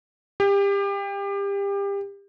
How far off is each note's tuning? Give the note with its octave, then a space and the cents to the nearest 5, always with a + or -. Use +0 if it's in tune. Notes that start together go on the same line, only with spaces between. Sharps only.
G4 +30